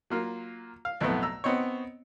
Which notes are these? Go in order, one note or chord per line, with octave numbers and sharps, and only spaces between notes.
F#3 A#3 F4
F5
B1 F2 A2 A3 B3
A#5 E6
B3 C4 D#4 C#5